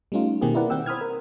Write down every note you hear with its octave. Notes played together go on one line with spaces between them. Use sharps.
G3 A3 C#4 D#4 F4
B2 D#3 A#3 C4 G4 G#4
E4 A#4 B4 D5 F#5
D#3 C4 F#5 G5 E6
C5 B5 D#6 F6 G#6
A#4